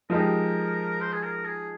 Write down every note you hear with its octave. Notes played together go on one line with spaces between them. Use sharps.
F3 G#3 D#4 G4 A#4
C5
G#4
A#4
G#4